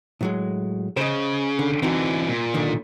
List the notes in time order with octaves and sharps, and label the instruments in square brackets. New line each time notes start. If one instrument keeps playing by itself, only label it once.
[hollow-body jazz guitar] A2 F#3 G#3
[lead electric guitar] C#3 [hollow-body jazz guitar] C5 D#5
[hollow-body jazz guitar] D3
[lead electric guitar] D3 E3 [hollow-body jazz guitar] C4 D#4 F#4
[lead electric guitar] A#2
[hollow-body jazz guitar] B1 D3 D#3